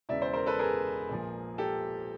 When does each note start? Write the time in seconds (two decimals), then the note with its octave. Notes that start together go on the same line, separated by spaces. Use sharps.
0.09 E1 E2 C#3 D5 E5
0.21 C5 D5
0.33 A#4 C5
0.46 A4 B4
0.59 G#4 A#4
1.09 A#1 A#2 F3
1.58 G4 A4